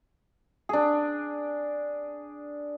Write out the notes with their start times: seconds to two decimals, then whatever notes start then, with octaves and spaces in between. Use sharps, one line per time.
0.69 D4 G#4